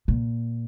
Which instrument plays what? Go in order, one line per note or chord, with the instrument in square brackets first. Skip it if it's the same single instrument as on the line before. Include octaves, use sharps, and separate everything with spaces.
[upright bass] A#2